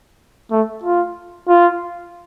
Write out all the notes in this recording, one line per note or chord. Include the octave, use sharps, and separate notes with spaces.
A3
F4
F4